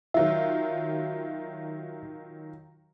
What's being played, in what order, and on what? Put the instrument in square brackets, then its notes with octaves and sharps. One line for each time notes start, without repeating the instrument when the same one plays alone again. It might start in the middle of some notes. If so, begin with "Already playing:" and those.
[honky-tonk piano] D#3 F#3 F4 [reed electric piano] E5